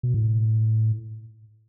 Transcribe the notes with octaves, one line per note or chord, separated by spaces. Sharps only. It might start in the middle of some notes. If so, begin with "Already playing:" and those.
B2
A2